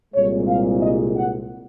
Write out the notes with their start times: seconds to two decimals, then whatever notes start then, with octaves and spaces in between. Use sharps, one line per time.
0.14 C2 A#2 G#3 C#5
0.48 F5
0.83 D#5
1.17 F#5